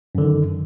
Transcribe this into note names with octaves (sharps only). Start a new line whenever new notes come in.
F#2 D3 D#3